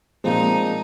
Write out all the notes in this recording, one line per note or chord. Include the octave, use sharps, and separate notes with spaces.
A#2 F3 G#3 C4 D#4